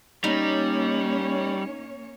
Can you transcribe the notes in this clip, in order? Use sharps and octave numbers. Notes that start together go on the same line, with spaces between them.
G3 A#3 C#4 D#4 C#5